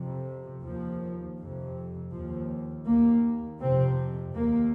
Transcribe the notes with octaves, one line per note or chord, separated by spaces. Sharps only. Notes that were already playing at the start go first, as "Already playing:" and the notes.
Already playing: F2 C3
D#2 F3
F2 C3
D#2 F3
D#2 A#3
F2 C3 C4
D#2 A#3